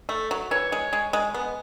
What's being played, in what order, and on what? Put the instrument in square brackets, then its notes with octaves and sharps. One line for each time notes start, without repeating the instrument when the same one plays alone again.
[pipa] A3
F#3
[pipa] E3 [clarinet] C#5
[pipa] G#3
G#3
G#3
B3